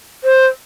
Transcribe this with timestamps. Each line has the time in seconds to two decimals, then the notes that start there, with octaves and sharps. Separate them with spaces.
0.24 C5